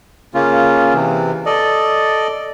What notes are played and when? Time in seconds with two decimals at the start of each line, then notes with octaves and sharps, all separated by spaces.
0.34 C#3 A#3 C#4 F4
0.94 C3 E3
1.46 A4 D5 D#5